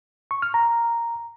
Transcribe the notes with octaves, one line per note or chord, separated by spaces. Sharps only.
C#6
F6
A#5